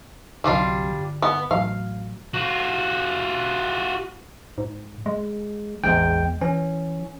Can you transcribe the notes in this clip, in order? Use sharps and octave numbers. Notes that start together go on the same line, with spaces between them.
G1 C2 F#3 G3 D4 F4
G1
B3
A1 F#3 F5
F4 F#4
G#2
G#3
A1 E2 G#3 G5
E3 C#4